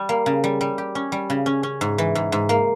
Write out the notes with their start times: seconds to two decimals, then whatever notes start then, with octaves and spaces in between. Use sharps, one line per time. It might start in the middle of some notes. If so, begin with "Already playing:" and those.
Already playing: G3
0.09 A#3
0.26 C#3
0.44 G3
0.61 G3
0.78 G4
0.95 C#4
1.12 G3
1.30 C#3
1.46 C#4
1.63 C#4
1.81 G#2
1.98 E3
2.15 G#2
2.32 G#2
2.49 A#3